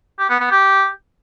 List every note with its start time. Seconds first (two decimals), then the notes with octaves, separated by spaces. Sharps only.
0.19 G4
0.30 B3
0.40 B3
0.51 G4